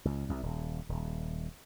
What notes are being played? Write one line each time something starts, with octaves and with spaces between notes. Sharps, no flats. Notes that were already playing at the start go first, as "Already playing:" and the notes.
C#2
C2
D#1
D#1